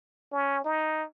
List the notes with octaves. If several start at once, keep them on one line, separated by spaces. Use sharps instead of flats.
C#4
D#4